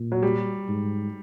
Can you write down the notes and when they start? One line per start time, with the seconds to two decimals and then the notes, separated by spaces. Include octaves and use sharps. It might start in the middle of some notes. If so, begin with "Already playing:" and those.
Already playing: A#2
0.12 F#3
0.23 G3
0.69 G#2